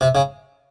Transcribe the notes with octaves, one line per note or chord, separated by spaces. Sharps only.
C3
C#3